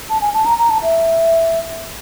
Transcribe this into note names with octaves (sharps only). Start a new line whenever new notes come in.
A5
G#5
A5
A#5
A#5
A5
E5